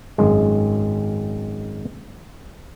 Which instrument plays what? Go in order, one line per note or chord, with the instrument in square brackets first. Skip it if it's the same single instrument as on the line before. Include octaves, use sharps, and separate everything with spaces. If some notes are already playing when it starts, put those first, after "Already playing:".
[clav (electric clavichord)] G#1 F#2 G#3